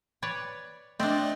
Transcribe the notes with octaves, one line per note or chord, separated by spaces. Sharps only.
B4 C#5 D5
A3 C4 D4 D5 D#5